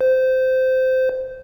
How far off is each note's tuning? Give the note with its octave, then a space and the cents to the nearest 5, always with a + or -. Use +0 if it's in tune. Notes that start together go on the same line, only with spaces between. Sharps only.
C5 -15